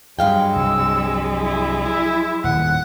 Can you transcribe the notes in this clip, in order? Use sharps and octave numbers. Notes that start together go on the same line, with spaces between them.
G2 F#3 G#3 F5 G5
C2 C3 E6
E4
E4
D#1 A2 F#5